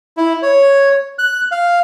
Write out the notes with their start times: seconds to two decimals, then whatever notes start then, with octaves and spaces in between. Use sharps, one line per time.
0.17 E4
0.42 C#5
1.19 F#6
1.51 F5